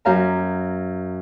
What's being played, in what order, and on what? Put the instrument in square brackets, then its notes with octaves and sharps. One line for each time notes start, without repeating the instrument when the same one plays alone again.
[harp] F#2 F5 A#5